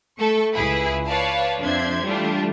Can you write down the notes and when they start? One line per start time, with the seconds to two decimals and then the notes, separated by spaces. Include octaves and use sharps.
0.19 A3 A4 C#6
0.53 C#2 E4 G#4 B4 B5
1.07 B4 C#5 D5 F5 A5
1.60 F2 D4 C5 E5 C6 G#6
2.05 E3 G3 A3 D4 F4